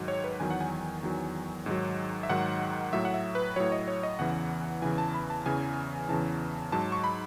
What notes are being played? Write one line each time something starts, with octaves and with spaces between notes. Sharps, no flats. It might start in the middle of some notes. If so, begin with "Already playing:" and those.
Already playing: G#2 D#3 F#3
C#5
B4
E2 D#3 F#3 G#5
F#5
G#5
E2 D#3 F#3
G#2 D#3 F#3
E5
G#2 D#3 F#3 F#5
A2 F#3 E5
F#5
E5
B4
A2 F#3 C#5
D#5
C#5
D#5
E2 C#3 E3 F#5
E2 C#3 E3 G#5
A5
B5
A5
E2 C#3 E3 G#5
E2 C#3 E3 A5
G#2 F#3 A5
C#6
B5